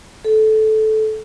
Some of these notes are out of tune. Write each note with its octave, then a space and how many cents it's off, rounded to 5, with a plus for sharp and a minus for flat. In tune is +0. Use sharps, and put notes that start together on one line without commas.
A4 -15